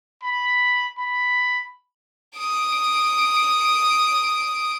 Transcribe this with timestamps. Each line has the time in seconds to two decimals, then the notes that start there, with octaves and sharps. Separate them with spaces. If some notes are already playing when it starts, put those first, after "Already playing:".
0.23 B5
0.98 B5
2.37 D#6 D7